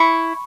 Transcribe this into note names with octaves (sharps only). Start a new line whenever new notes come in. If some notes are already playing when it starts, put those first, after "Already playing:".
Already playing: E4 C#6